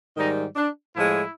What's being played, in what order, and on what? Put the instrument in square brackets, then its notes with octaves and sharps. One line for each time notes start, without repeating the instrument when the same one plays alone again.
[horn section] G#2 D#3 G3 D#4
D4
A2 F3 G#3 E4